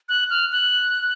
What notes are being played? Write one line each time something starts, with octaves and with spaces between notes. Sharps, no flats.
F#6
F6
F#6